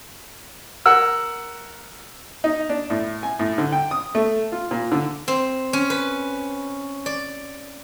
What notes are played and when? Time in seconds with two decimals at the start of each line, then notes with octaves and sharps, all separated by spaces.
0.86 A#4 F#5 E6
2.44 D#4
2.69 D4
2.90 A2
3.23 G#5
3.39 A2
3.58 D3
3.72 G5
3.91 D#6
4.15 A3
4.52 F4
4.71 A#2
4.92 D3
5.28 C4
5.73 C#4
5.90 B4
7.06 D5